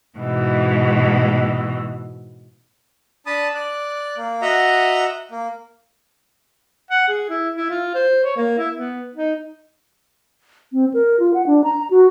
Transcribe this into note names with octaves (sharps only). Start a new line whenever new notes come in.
G#2 B2 E3
D4 A5 B5 D#6
D5 F#6
A#3
F#4 D#5 E5 F#5 A#5
A#3
F#5
G#4
E4
E4
F4
C5
C#5
A#3
E4
B3
D#4
C4
A#4
F4
F#5
D4
A#5
F#4